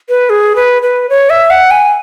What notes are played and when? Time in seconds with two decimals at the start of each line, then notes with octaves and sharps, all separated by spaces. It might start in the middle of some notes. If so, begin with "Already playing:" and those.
0.09 B4
0.30 G#4
0.56 B4
0.83 B4
1.09 C#5
1.30 E5
1.50 F#5
1.71 G#5